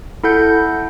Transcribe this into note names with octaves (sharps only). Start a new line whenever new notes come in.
E4 A4 F#5 G6